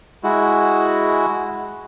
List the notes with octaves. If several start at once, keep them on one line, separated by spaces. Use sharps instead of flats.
G#3 E4 F#4